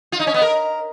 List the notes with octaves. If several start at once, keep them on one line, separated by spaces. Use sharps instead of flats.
F4
D#4
C#4
B3
A#4